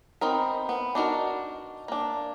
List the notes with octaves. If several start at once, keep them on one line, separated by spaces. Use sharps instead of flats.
B3 C4 D#4 A#4
B3
D4 D#4 F#4 A#4
A#3 D4